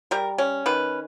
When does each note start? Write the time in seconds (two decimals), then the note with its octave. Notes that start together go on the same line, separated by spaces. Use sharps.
0.11 G3 A#4
0.38 C#4
0.66 D#3 B4